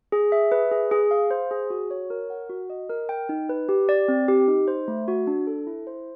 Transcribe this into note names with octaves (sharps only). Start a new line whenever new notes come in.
G#4
E5
B4
G#4
G#4
F5
C5
G#4
F#4
C#5
A#4
F#5
F#4
D#5
A#4
G5
D#4
B4
G4
D5
C4
G4
D#4
C5
A3
F#4
D4
A4
E4
C5